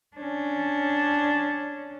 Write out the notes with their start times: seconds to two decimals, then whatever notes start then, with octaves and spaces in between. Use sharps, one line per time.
0.17 C#4 D4